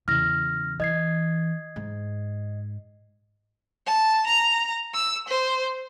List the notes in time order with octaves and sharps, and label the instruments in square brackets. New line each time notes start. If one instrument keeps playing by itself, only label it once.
[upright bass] E2 C#3 [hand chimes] F6 A#6
[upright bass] E3 [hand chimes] D#5 G#6 C7
[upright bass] G#2
[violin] A5
A#5
E6
C5